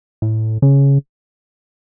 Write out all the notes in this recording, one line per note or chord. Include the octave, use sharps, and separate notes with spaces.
A2
C#3